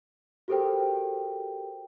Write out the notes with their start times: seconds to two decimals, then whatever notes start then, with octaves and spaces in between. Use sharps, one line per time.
0.48 F#4 G4 A4 A#4 C5 G5